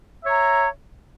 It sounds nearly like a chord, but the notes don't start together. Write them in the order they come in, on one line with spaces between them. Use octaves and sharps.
E5 C#5 A#5